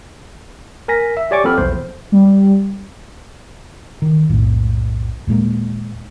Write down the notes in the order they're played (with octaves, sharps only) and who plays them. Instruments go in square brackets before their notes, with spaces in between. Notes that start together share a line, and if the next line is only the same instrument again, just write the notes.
[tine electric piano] A#4 G#5 A#6 B6
E5
G4 C#5 D5 G#5 C#6 D6
F3 B3 C4 A4 B5 F6
B1 E2 C5
[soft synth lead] G3
[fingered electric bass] D#3
B1 F2 A2
D#2 A#2 G#3 A#3